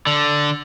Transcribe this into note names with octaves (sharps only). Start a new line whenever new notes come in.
D3